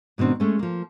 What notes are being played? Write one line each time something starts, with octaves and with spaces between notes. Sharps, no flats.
G#2 B2 D#3 C4 D4
G#3 A3 C#4
F3 A#3